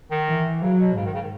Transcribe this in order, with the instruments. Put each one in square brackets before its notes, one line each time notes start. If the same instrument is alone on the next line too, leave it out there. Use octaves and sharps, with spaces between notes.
[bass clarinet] D#3
[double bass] E3
[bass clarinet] C#3 [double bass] F#3
[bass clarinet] B2
[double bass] G#2 [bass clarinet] C#3
[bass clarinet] D#3
C#3
D#3